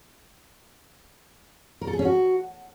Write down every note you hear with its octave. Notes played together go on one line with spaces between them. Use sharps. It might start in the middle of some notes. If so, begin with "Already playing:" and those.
A#4
A4
G#4
C#4
F#4